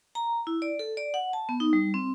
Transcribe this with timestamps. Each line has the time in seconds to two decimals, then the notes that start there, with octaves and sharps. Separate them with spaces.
0.15 A#5
0.47 E4
0.62 D5
0.79 A4
0.97 D5
1.14 F#5
1.33 A5
1.49 B3
1.60 D#4
1.73 G3
1.94 C4